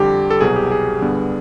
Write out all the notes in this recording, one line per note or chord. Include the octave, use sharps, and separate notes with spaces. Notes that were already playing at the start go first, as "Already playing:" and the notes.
Already playing: F2 D3 G3 G4
A4
C2 B2 F#3 G#4
G4
G#4
G2 D3 G3 B3